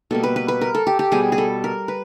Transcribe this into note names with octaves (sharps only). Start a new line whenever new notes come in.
B2 G3 A#3 A4
B4
B4
B4
A#4
A4
G4
G4
B2 G3 B3 G#4
G#4
A4
A#4
B4